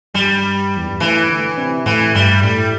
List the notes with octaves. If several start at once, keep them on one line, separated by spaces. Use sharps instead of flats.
G2 G3
E2
G2
A2 E3
D3
C3
A2 E3
G2 G3
A2 G3